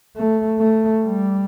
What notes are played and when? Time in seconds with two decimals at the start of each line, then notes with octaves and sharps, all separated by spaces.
0.16 A3
0.59 A3
1.03 G3